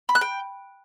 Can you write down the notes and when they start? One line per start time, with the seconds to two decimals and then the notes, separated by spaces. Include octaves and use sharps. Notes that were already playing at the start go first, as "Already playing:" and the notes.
0.09 B5
0.15 F#6
0.21 G5